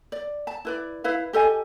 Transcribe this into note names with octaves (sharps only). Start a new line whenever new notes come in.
D5
A5
E4 B4 D5
E4 B4 F5
G4 A4 D#5 G#5